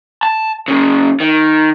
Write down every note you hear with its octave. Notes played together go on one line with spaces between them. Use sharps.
A5
F#2 C#3
D#3